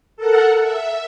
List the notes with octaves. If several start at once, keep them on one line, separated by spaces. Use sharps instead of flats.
A4 A#4 F#5
E5